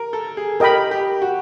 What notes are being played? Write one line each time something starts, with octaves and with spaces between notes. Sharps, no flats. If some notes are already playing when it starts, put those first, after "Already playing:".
Already playing: A#4
A4
G#4
G4 A#4 D#5 G5 B5
G4
F#4